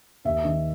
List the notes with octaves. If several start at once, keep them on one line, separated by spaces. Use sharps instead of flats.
D#2 E5
D#3